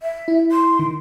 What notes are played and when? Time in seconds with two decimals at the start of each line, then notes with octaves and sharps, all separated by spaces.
0.03 E5
0.28 E4
0.52 C6
0.79 D#3